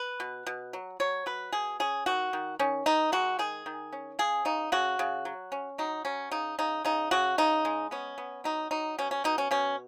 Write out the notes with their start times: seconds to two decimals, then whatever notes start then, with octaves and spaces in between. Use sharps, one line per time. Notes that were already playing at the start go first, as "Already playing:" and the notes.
Already playing: B4
0.20 B2
0.47 B2
0.73 F#3
1.00 F#3 C#5
1.26 F#3 B4
1.53 B2 G#4
1.80 C#4 G#4
2.06 D#3 F#4
2.33 D#3
2.59 D#3 C#4
2.86 D#3 D#4
3.12 G#3 F#4
3.39 D#3 G#4
3.66 D#3
3.93 C#4
4.19 C#3 G#4
4.45 C#3 D#4
4.72 C#3 F#4
4.99 C#3
5.25 F#3
5.52 C#4
5.78 F#3 D#4
6.05 F#3 C#4
6.32 C#3 D#4
6.59 C#3 D#4
6.85 C#3 D#4
7.11 C#3 F#4
7.38 C#3 D#4
7.65 G#3
7.91 B3 C#4
8.18 B3
8.44 F#3 D#4
8.71 F#3 D#4
8.98 B2 C#4
9.11 C#4
9.24 B2 D#4
9.38 C#4
9.51 B2 C#4